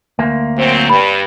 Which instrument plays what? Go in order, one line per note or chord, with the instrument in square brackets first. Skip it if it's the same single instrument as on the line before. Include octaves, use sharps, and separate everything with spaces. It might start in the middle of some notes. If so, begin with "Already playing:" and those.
[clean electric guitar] D2 A#3
[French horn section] A#2 F#3 C4
[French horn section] G2 [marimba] B5